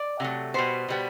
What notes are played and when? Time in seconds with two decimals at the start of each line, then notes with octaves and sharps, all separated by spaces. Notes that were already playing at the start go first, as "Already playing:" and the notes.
Already playing: D5
0.20 C3 F#3 A3
0.54 B2 G3 B3 C5
0.88 B2 G3 B3